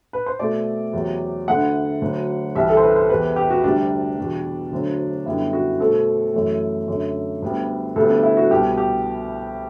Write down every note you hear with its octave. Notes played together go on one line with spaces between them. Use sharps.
B4
C5
B2 A3 C4 D5
E2 C3 F#3
D2 D3 A3 F#5
D2 D3 F#3
C2 C3 E3 G3 E5
A4
C5
B4
C5
E2 C3 E3 B4
G4
F#4
D2 C3 G3 D4
E2 B2 G3
D2 D3 F#3 C4
F#2 D3 G3 B3 E4
F#4
B2 A3 C4 A4
F#2 E3 A3
F#2 D3 A3
D2 D3 G3 B3
D2 C3 G3 B3 A4
D4
E4
F#4
C2 B2 G3 B3 G4
G4